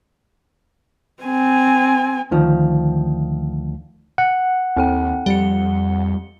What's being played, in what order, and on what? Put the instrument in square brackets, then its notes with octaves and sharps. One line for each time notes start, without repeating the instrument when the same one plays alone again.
[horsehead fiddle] C4 G#5
[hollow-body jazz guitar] D2 D#3 F3
[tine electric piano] F#5
[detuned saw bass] D#2 [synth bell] C4 A4 G5
[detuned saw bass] F2 [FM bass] G3 [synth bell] C#7 G7